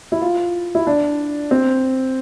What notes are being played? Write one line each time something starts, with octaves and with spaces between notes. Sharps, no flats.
E4
F4
E4
D4
C4